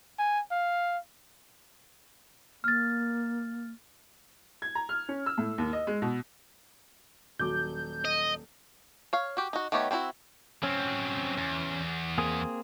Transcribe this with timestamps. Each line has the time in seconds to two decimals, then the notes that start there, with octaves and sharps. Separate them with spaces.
0.19 G#5
0.51 F5
2.64 A#3 F6 A6
4.62 G#6
4.75 A#5
4.89 F6
5.09 C#4
5.26 E6
5.38 A2
5.58 D#2
5.73 D#5
5.87 G#3
6.02 B2
7.39 D#1 F#3 D6 G6
8.05 D#5
9.13 C#5 F5
9.37 F#4 G4
9.53 D#4 F#4
9.72 D#3 A3 B3 G4 C#5
9.91 C4 D4 E4 F#4
10.63 F#3 C4 C#4
11.38 E2
12.18 A#3 C4 G#4